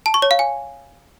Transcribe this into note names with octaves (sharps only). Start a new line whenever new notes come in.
A5
C#6
C#5
F5
G#5